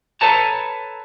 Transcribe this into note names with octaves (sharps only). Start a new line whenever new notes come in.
A4 B4 C#5 A5 A#5